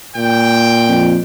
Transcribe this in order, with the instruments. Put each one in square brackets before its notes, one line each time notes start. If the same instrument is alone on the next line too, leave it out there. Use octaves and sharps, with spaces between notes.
[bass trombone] A#2 [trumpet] G5
[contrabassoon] F2